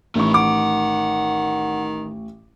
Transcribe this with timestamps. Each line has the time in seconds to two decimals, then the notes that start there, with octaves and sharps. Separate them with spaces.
0.15 A1 D#3 A3 E4 C#6
0.34 F#5 D6